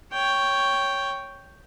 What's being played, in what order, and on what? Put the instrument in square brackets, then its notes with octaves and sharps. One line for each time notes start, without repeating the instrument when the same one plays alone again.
[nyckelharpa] C#5 G5